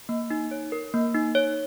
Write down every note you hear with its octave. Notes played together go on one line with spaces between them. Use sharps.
A#3
D#4
C#5
A#4
A#3
D#4
C#5